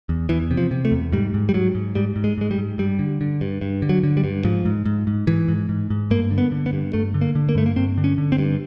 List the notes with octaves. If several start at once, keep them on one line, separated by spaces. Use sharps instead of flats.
E2
E2 E3
C3
F3
C3
A3
E2
G#2 G3
G#2
G3
G#2 F#3
G#2
G#2 G3
G#2
G#3
G#2 G#3
G3
G#2
G2 G3
D3
D3
G2
G2
D3
F#3
D3
G3
G2
G#2 F3
G#2
G#2
G#2
G#2 E3
G#2
G#2
G#2
G2 A#3
D3
B3
D3
B3
G2
G2 A3
D3
A#3
D3
A#3
G2 A3
A#3
G2 C4
D3
C#4
D3
C4
G2